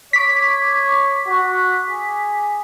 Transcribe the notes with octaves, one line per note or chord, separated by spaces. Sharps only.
C#5 D6 B6
F#4
G#4